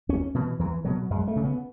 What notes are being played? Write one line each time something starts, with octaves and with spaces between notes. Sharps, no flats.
E2 C#4
B2 E3
E2 E3
B2 F#3
F#2 G#3
A3
C#3
B3